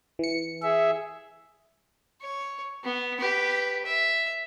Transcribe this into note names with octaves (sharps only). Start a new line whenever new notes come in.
E3 C#7
G#4 E5
C#5
B3
G4 B4
E5